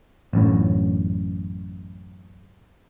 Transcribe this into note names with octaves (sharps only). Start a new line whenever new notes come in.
A1 F#2 A2